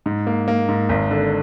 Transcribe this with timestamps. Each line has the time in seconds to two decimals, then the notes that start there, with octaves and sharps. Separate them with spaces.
0.06 G#2
0.27 A#3
0.48 A#3
0.69 G#2
0.89 G#1
1.11 D3